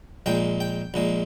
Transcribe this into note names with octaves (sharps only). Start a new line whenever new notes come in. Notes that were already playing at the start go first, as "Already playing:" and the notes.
A#1 A#2 G#3 G5
G5
A#1 A#2 G#3